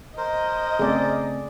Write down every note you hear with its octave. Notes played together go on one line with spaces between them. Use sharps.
A#4 C5 D#5
C#3 A3 C4 G#4 D5